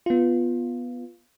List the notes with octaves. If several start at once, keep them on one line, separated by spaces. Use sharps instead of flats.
B3 F4